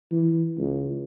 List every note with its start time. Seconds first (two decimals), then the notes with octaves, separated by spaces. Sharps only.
0.11 E3
0.58 C#2